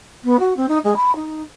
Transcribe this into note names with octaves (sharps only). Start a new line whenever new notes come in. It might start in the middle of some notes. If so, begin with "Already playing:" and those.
B3
F#4
C4
D#4
G#3
B5
D#4